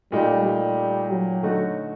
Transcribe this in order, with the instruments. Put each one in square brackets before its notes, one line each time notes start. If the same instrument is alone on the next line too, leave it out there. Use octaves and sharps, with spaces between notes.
[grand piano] A#2 A3 D#4 G4 [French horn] G3
[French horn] G3
F#3
[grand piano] D3 A3 D#4 F#4